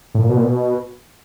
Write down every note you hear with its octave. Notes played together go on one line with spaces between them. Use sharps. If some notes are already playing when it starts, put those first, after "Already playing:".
A2
A#2
B2
A#2
B2